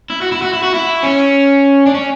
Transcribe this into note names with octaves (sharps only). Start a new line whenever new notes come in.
E4
F#4
E4
F#4
E4
F#4
E4
C#4
D4
C#4